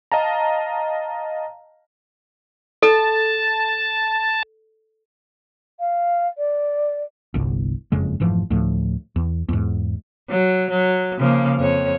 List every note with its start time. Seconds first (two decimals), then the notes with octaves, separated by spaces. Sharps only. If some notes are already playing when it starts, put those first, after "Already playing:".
0.12 D#5 F5 A5 A#5
2.83 A4 A5
5.80 F5
6.38 D5
7.34 G1 C2
7.92 F#1 F2 C#3 G#3
8.20 F1 G#2 E3 F3
8.51 D2 A2 F3
9.16 E2
9.49 E2 G#2
10.29 F#3
10.70 F#3
11.18 C#3 F3 A#3
11.59 F2 C#5